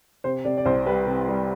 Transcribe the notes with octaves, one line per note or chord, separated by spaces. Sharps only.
C3 C5
C3 D5
D5
C2 C5
G3 B4
C3
G3